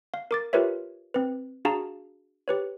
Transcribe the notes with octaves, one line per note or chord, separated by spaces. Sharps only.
F5
A#4 D6 A6
F4 G4 A#4 B4 C#5 E5
C4 B4
D4 F#4 G#4 F5 A5 A#5
G4 B4 C#5